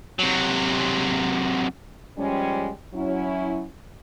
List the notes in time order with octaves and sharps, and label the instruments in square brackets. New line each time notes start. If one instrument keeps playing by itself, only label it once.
[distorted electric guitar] C3 F#3
[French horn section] F3 G3 G#3 C#4
F#3 C#4 E4